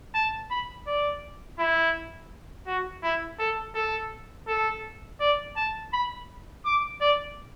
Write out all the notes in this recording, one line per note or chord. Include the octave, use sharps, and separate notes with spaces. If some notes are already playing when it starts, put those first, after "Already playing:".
A5
B5
D5
E4
F#4
E4
A4
A4
A4
D5
A5
B5
D6
D5